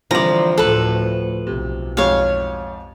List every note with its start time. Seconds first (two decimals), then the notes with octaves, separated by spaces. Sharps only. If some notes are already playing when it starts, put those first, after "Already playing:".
0.11 C2 D3 E3 F3 D5 A#5
0.58 D2 A2 A4 B4
1.47 B1 C3
1.97 F2 G#2 G4 C#5 F5